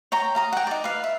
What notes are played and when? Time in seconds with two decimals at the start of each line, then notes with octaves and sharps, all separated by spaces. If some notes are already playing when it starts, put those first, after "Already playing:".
0.12 C#5 G5 A#5
0.35 F5 A#5 D#6
0.53 F#5 G5
0.67 D#4 D5
0.84 B4 F5
1.04 E5